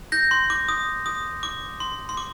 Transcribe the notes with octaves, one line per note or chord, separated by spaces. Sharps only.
G6 A#6
C6
D6
D#6
D#6
D6
C6
C6
D6